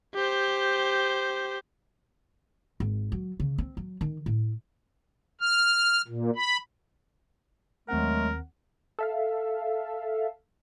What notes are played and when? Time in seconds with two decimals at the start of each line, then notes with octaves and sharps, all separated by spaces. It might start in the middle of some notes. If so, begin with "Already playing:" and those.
0.15 G4 C5
2.80 G#1
3.12 F#3
3.40 C#3
3.58 C4
3.77 F#3
4.01 D#3
4.26 A2
5.41 F6
6.07 A#2
6.36 B5
7.88 D#2 F#3 G#3 A3 C4 A#4 F#5
8.99 A4 E5 F5